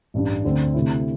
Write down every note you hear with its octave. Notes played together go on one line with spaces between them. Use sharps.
A1 G2 G3 D4
D2 D3 C4
D2 C3 A3 E4